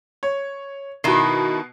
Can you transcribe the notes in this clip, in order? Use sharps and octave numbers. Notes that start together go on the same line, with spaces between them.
C#5
B2 D#3 E4 C7